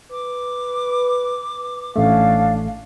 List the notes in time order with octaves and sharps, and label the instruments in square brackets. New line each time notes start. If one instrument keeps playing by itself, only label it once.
[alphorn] B4 [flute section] D6
[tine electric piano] A1 A3 [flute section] C#4 D4 F5